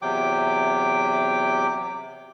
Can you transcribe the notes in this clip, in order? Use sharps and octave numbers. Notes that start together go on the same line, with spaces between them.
E2 C3 F#3 G5 D6